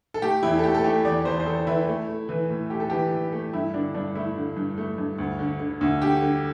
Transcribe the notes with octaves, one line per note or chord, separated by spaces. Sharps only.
A4
A3 G4
E2 E4
A4
A3 G4
A4
A3 G4
E2 D5
E2 C5
C5
E2 A4
E3 E4
A3
A3
E3
A2
A3 G4
A4
E3 G4
E3
A3
G2 E4
D3 D4
G2 D4
A3 E4
D3
G2
A3
G2
D2
D3
D3
D2
D3 G4
D3